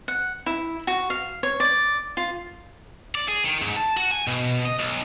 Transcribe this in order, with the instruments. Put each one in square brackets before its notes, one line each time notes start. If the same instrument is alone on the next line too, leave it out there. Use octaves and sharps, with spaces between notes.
[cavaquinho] F#5
E4
F#4
F5
C#5
D5
F4
[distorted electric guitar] D5
G#4
D#3
G#2
A5
F#4
G#5
B2
D#5
B1